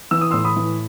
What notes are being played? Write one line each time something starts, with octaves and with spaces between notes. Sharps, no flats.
E3 E6
D#6
A2 C6 E6
B5 D#6
E3